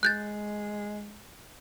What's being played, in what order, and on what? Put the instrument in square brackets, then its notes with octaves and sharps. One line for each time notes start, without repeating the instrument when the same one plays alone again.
[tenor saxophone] G#3 [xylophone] F#6 G6 A6